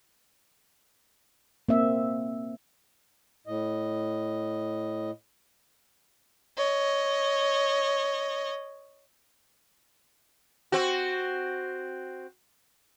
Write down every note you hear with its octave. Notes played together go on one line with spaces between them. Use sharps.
A#3 C4 E5
A2 D#5
C#5 D#5
C4 F#4